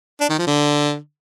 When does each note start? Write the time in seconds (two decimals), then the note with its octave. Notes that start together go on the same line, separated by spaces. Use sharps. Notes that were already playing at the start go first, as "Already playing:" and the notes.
0.20 D4
0.29 D#3
0.38 F3
0.47 D3